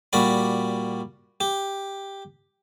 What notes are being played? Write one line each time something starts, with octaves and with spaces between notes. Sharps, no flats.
A#2 G3 F#4 D5 B5
G4